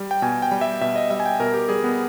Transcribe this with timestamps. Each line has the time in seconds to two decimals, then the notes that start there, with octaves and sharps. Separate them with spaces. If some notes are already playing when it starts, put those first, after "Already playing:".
Already playing: G3
0.11 G5
0.22 B2 G#5
0.42 G5
0.51 G3
0.61 E5
0.81 B2 E5
0.96 D#5
1.10 G3 E5
1.20 G#5
1.25 G5
1.40 B2 A#4
1.54 G4
1.69 G3 G#4
1.84 B3